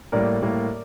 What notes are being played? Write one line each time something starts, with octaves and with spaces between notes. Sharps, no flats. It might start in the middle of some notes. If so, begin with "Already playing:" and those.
A2 G3 A#3 A#4 D5
A2 G3 A#3